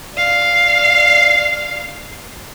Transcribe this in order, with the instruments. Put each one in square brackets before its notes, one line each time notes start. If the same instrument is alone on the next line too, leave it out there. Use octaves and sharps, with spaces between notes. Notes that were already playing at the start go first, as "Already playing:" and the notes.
[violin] D5 F5